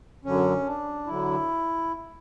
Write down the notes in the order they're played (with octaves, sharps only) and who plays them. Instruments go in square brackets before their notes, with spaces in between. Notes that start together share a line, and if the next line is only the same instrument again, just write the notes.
[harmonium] F#2 D3 F#3 C#4
D4
D3 F#3 E4